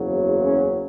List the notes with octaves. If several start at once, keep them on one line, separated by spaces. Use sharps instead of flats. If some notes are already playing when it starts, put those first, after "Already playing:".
Already playing: F#1 E2 C#3 F#3
C#4